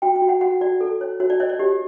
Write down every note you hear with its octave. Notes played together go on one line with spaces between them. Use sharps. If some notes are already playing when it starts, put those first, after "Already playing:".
F#4 G5
G5
F#4
F#5
F#4 F#5
F#4 D5
A4
C#5
F#4 C#5
D5
C#5 D#5
D5
G4